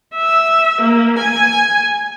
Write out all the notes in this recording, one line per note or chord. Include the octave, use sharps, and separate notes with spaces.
E5
A#3
G#5